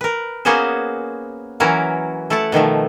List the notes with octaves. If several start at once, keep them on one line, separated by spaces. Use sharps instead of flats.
A#4 B4
A#3 B3 C#4 F#4 G#4 C5
E3 F#3 C#4 E4 F#4 A#4
A3 E4 A4 F#5 A5
B2 D#3 F3 A3